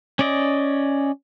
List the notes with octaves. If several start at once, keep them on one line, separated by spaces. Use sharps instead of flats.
C#4 D5 D#5